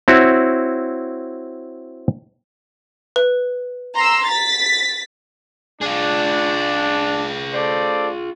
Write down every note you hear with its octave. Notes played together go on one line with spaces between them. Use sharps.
C4 E4 F#4 C#5
B4
A#5 C6 E6
A6 B6
D4 F4 G#4
A4 C5 D5